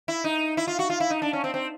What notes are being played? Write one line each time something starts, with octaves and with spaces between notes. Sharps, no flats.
E4
D#4
E4
F4
F#4
F4
E4
D#4
D4
C#4
C4
C4